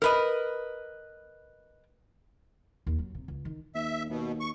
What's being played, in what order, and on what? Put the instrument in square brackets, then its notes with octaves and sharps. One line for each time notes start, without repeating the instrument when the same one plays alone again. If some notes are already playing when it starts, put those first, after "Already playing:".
[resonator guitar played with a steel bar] A#4 B4 D#5
[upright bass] D#2
F#3
C3
C#2
D#3
[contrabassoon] D#2 [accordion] E5
[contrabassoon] D#2 [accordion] B2
[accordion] C#6